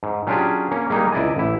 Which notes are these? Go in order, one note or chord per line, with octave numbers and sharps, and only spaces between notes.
G#2
F#3 C#4 D4 F4 G4 G#4
A#3 C#4
G3 G#3 A#3 D#4
C#2 E4 D5 D#5 G#5
A1 E4